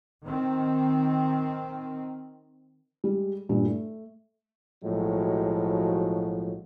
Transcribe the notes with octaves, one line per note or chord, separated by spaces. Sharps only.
D#3 C4
G3 G#3
G2 A#2 G3
A3
B1 A2 F3 F#3 G#3 F#4